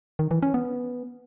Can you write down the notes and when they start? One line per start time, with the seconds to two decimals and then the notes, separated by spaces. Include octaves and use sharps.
0.19 D#3
0.31 E3
0.42 C#4
0.54 B3